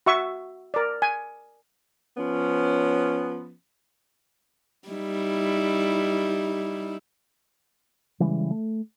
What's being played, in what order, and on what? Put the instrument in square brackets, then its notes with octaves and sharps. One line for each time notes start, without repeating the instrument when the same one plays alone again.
[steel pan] F#4 E5 C#6
A#4 D5
G#5
[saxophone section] F3 B3 C#4
[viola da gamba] G3 D#4 E4
[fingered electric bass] C#3 E3 G3 G#3
A3